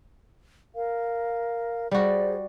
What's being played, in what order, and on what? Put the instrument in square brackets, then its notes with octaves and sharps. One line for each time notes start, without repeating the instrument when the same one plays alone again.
[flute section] A#4 F5
[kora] G3 F#4 [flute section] G#4 C5 D5